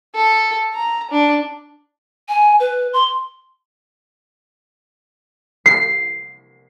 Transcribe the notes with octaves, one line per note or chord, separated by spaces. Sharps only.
A4
A#5
D4
G#5
B4
C6
C7